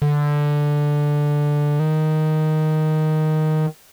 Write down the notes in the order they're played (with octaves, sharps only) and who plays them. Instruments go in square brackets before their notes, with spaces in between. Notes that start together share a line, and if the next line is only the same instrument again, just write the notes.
[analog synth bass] D3
D#3